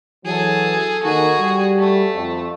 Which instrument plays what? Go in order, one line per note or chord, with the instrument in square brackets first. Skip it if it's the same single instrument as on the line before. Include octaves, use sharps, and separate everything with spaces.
[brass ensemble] E3 F#3 [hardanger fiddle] G#4 A4
[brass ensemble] D#3 A#3 D#4 [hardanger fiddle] F#4 G#4
[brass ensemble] G3
[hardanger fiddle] A3
[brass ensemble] F2